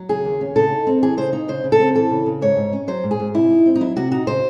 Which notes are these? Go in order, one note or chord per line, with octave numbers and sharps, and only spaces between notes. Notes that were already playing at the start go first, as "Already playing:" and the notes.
Already playing: F#3
C#3 G#4
D#2
C#4
C#3 A4
D#4
C4
E3 G#4
C#3 C5
D#4
C#3 C5
C#3
A4
C4
E3 A4
C#3
C#3
G#2 C#5
G#2
C#4
F#3 C5
G#2
G#4
G#2
C3 E4
D#4
C4
D#4
F#3 E4
C3 F#4
D#4 F#4
C#3 C5